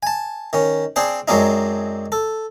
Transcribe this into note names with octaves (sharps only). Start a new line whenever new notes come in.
G#5 A5
D#3 C#4
C4 D4 G#4 C5
F#2 F#3 G#3 C4 D4 D#4
A4